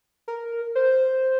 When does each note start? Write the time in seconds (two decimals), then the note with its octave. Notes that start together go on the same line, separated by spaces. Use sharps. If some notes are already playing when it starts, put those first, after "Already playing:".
0.28 A#4
0.75 C5